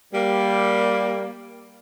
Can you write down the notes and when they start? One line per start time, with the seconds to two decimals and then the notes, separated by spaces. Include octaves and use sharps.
0.14 G3 A#3